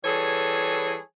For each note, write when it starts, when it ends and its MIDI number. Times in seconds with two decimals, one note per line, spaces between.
0.05 0.97 52
0.05 0.97 55
0.05 0.97 68
0.05 0.97 69
0.05 0.97 73